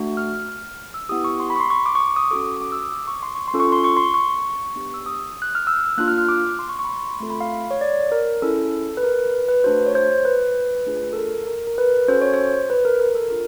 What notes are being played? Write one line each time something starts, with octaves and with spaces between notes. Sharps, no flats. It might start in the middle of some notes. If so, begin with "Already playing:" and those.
Already playing: A3 D4 F#4
F6
F6
E6
B3 E4 G4 D#6
C#6
C6
B5
C#6
C6
C#6
D6
C#6
D6
D#6
C#4 F#4 A4 D6
D6
E6
D#6
D6
C#6
C6
C#6
C6
C#4 F4 A4
C#6
C6
C#6
C6
C#6
B3 D4 G4
E6
D#6
F#6
F6
E6
A#3 D4 F4 F#6
F6
F6
D6
C6
C#6
C#6
B5
C6
A3 C4 F4 A4 C6
B5
F5
C#5
D5
A#4
C#4 E4 G#4 A4
B4
A#4
B4
B4
A3 D4 F#4 C5
C#5
C5
B4
A3 D4 F4 G#4
A4
A#4
A#4
A#4
B4
C#4 F#4 A4 C5
C#5
C5
B4
A#4
A#4
A4
D4 F4 A4 A#4